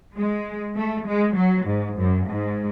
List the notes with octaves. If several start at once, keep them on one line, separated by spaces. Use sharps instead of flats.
G#3
A3
G#3
F#3
G#2
F#2
G#2